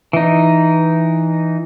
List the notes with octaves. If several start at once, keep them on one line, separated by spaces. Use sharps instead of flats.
E3 D#4